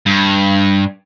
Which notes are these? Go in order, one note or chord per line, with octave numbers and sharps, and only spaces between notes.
G2